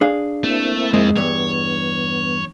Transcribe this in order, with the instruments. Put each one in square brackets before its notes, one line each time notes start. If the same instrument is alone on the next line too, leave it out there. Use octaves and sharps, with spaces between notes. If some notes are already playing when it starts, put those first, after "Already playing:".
[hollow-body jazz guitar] D4 G#4 F5
[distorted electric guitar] A3 [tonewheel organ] A#3 C4 E4
[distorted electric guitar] F2 [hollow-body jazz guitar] G#3
[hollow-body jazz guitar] E2 G2 [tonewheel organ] B3 [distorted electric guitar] C#5